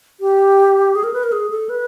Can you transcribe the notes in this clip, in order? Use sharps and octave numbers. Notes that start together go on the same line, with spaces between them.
G4
G#4
A#4
B4
A#4
G#4
A4
B4